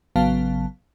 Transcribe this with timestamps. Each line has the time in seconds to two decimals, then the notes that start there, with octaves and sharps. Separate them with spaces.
0.16 A1 C#3 F#3 B3 F5 A5